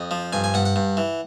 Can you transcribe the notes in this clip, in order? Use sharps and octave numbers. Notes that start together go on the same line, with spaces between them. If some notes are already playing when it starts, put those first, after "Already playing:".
Already playing: F2 D#5
F3
G2 G#5
G#5
G2 F#5
F#5
G2
E3